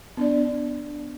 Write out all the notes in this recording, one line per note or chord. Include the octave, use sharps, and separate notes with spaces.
B3 D4 D5